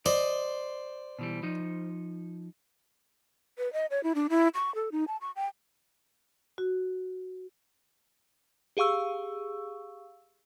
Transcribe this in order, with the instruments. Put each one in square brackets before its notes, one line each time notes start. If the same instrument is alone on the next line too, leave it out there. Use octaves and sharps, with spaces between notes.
[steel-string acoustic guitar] C5 [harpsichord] D5 [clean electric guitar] D#5
[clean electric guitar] B2 E3 G3
F3 D#4
[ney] B4
D#5
C#5
E4
D4
E4
C#6
A4
D#4
A5
C#6
G5
[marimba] F#4
[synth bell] G4 G#4 F5 C#6 E6